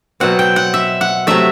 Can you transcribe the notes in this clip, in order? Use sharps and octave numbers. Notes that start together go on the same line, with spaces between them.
B2 F#3 C4 F#5
G5
F#5
E5
F#5
C3 F#3 A3 E5